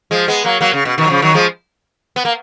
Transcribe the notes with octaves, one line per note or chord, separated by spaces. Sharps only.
F3 G#3
G#3 B3
F#3 A#3
F#3 A#3
C#3
B2
B2 D#3
F#3
C#3 F3
D#3 F#3
F3 G#3
B3
A#3